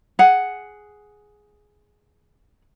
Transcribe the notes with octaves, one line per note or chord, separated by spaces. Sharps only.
G#4 F#5